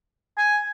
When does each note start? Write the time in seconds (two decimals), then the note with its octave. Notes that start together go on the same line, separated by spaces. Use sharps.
0.38 G#5